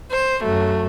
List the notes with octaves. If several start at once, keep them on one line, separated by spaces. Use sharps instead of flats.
C5
F#2 F#3 A3